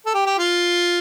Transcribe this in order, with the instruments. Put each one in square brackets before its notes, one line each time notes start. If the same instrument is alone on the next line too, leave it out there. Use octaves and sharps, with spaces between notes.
[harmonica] A4
G4
G4
F4